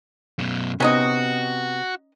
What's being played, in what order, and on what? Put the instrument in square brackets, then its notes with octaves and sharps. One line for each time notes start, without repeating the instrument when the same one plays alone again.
[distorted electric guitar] F#2 B2
[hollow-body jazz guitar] C3 B3 [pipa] C#4 D#4 D#5 [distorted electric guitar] F#4